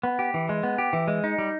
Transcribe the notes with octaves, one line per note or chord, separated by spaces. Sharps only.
B3
G4
E3
G#3
B3
G4
E3
G#3
D#4
G3